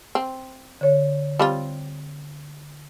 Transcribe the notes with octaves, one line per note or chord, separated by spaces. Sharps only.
C4
D3 C#5
G3 C4 F4